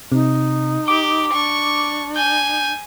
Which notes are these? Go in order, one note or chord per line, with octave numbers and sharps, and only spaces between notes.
C3 D#4
G4 D6
D4 C#6
G#5 G6